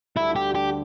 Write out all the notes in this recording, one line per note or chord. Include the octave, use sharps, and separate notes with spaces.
D2 D3 G3 D4 E4
G4
G4